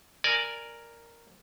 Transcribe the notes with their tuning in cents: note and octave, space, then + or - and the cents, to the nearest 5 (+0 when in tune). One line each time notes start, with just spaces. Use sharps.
A#4 +0 D5 +0 G#5 +0